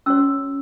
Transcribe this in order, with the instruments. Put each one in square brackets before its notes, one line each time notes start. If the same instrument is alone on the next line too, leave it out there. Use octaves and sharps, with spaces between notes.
[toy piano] C#4 F#4 C#5 E6